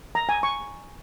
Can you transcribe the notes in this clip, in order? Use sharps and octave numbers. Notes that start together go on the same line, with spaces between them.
A#5
G#5
C#6